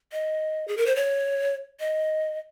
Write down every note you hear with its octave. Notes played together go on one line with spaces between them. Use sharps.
D#5
G#4
A#4
C5
C#5
D#5